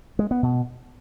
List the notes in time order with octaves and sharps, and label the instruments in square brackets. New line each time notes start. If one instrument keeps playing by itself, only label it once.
[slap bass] G#3
B3
B2